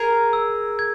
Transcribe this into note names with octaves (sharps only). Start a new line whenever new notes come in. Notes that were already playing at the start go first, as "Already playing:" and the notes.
Already playing: G#4 A#4 G#6
E6
G#6